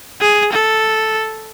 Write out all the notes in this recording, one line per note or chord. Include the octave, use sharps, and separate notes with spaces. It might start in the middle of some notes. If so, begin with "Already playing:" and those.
G#4
A4